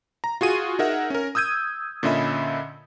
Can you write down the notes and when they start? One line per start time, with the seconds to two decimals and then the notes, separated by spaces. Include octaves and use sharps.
0.24 A#5
0.41 F4 F#4 G#4 D#7
0.79 D#4 G#4 A#4 E5 F#5
1.10 C#4 A#4
1.35 D#6 E6 G6 G#6 D#7
2.03 A#2 D3 C#4 D#5 E5 B5